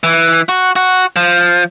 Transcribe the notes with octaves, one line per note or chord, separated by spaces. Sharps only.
E3
F#4
F#4
F3